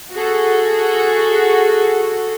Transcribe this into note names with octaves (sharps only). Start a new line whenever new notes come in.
F#4 G#4 A4